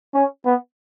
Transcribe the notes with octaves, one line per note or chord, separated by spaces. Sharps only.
C#4
B3